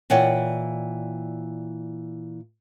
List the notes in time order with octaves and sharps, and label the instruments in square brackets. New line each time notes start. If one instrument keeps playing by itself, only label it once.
[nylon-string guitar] A#2 E3 C#5 D5 F#5 G5